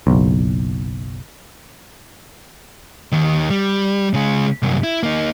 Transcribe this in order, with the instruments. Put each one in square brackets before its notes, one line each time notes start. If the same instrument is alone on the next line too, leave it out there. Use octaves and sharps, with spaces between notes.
[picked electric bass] F#1 B1
[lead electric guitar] D#2 D#3
G3
C#3 G#3
C2 F#2
E4
A#3 D#4